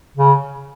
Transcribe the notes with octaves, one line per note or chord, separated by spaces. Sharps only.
C#3